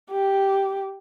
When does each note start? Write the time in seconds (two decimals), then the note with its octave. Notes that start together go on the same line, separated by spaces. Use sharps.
0.11 G4